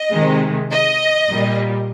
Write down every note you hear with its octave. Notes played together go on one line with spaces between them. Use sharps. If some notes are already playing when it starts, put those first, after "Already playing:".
Already playing: D#5
C3 D#3 G#3
D#5
A#2 G3